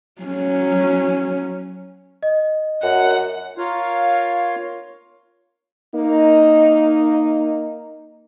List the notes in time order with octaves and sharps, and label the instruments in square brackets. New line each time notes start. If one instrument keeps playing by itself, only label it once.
[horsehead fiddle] F#3 C#4
[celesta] D#5
[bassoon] F#2 [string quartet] F#5
[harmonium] F4 A#4 C#5 F5
[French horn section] A#3 D#4